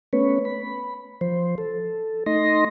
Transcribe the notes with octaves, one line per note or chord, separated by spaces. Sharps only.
A3 B3 C#4 B4 C#5
B5
F3 C5
A4
A3 D#4 D#5 C6 A#6